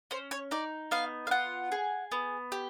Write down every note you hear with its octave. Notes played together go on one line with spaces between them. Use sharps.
C#4 C5
C#5
D#4 D5
B3 F5
F5
F4 F#5
G#4
B3
G4